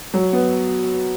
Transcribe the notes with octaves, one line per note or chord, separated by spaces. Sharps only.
F#3
B3